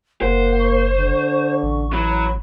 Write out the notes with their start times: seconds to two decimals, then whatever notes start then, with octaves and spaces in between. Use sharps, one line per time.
0.22 F#1 A#3 C5 F#5
0.60 C#6
0.97 D3
1.63 A1
1.93 E3 F#3 B5